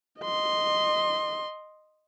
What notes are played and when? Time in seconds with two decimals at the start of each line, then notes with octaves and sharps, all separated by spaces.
0.22 D#5 C6